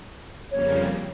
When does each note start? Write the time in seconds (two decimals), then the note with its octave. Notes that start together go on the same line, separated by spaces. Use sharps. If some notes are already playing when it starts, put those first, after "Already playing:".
0.50 F2 C#3 G3 A#3 C#5